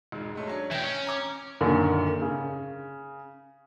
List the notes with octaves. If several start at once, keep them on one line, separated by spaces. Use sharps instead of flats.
E1 G#2 G#3
G#3 A3 C#5
F#3 C#4 D4
E3 G5 A#6 B6 E7
C#4
A#5 D6
F#2 A#2 D3 D#3
C#3